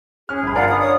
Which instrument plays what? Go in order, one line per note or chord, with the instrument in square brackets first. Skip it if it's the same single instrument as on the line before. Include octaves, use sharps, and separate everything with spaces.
[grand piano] C#4 F6 [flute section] G#4
[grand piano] G1 B5
[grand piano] D4 A#4 D5 [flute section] F4 F5 F#5
[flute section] D#6
C#5 D#6